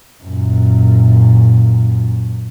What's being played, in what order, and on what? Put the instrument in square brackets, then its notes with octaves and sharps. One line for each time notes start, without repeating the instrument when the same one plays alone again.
[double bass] F#2 A#2